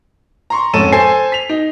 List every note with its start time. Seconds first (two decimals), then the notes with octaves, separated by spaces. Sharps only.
0.50 A#5 C6 C#6
0.74 F2 G#2 C#4 A4 D#7 E7
0.92 A4 C5 G#5 C7
1.32 B6 F7
1.49 D#4